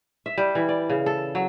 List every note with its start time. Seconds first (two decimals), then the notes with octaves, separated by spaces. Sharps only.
0.26 E5
0.38 G3
0.55 E3
0.69 D5
0.90 C#3
1.06 A4
1.35 F#3